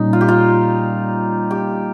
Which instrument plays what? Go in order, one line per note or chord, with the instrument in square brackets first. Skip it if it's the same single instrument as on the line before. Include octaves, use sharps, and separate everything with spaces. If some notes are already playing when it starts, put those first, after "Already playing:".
Already playing: [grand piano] A#2 G3 C#4 [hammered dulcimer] D#4
[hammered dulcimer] F4
G4
F4
G4